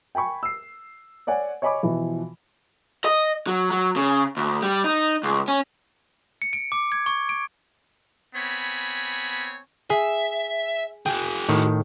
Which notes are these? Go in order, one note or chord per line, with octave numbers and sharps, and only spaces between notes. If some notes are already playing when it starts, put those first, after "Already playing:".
G5 G#5 B5 C#6
E6 C7
C#5 D5 F#5 G#5
C#5 D#5 G#5 B5 C#6 D6
B2 E3 F3
D#5
F#3
F#3
C#3
D2
G3
D#4
C#2
C#4
C#7
D7
D6
G#6
C#6
D7
B3 C4 C#5 G#5 B5
G#4 E5
F#4 G#4 G5
A2 D#3